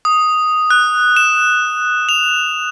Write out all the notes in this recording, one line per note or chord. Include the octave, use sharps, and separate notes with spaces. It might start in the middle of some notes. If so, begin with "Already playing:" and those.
D#6
F#6
E7
F7